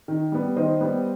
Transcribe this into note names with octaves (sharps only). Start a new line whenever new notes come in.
D#3
G3 B3
D#3 C5 D#5
G3 B3